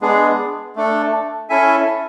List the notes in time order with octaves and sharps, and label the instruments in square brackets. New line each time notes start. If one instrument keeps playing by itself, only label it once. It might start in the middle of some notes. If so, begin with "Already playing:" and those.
[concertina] G#3 B3 D4 G#4
A3 D4 A4
C#4 E4 A4 E5 G#5